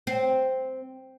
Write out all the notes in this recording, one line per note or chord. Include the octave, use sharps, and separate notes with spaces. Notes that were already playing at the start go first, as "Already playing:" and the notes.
C4